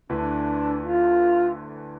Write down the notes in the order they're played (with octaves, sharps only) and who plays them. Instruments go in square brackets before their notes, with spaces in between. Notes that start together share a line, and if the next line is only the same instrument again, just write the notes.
[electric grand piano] D2 D3 A3 E4 B4 [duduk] D4
[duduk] F4